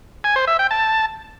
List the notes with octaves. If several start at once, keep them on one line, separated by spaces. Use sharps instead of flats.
G#5
C5
E5
G5
A5